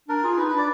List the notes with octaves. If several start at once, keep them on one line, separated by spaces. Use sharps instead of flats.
D4 A#4
F4 G#4
D#4 B4
D4 B4
D5